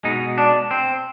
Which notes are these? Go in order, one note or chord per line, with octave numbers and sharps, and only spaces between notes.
B2 G#3 B3 D#4
D4
C4